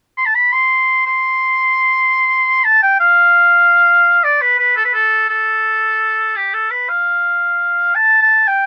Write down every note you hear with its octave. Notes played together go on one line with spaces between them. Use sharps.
C6
A5
B5
C6
C6
A5
G5
F5
D5
B4
B4
A4
B4
A4
A4
G4
A4
B4
F5
A5
A5
G5